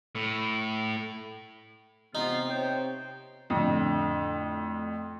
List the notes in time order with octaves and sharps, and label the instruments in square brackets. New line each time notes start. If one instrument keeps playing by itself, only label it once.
[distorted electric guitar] A2
[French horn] C3 [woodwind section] B3 F4 [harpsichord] D#4
[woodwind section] C5 C#5 G5
[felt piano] F2 A2 D3